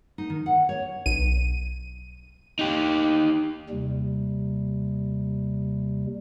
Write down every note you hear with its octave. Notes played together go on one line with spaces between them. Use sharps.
D#4
D#3
F#5
C#5
B1 D#7
D#4 G4
D#2 C3 G3